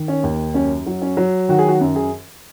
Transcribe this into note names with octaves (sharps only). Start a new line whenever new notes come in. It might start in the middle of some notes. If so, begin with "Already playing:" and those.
Already playing: D#3
C#4
D#2
F#2 C#4
F#3
C#4
F#3
D#3 F#4
G#4
F#4
F#2
G#4